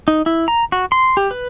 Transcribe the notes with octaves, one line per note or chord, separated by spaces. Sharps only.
D#4
E4
A#5
F#4
C6
G4
B4